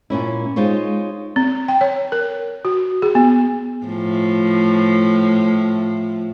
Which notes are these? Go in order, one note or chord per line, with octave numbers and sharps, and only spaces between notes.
A#2 C#4 E4
G#3 D#4 F4 C5 C#5
C4
G5
C#5
A#4
F#4
G#4
B3
A2 F3 A3